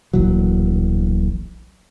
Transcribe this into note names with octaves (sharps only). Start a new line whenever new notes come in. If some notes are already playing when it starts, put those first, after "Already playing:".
D1 A#1 E3 F#3